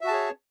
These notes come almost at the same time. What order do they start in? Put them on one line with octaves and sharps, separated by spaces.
E5 F#4 A5 G#4 C#5